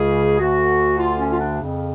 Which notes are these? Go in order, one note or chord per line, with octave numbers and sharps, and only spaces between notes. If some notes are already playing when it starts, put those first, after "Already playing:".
Already playing: C#2 C#3 G#4
D2 D3 F#4
F4
C#4
F4
D4
F2 C#3